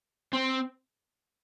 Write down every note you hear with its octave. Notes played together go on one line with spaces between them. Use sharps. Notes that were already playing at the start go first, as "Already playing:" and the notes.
C4